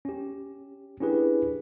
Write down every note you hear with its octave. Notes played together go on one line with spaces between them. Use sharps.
C#4 G4
C#4 D4 E4 G4 G#4 B4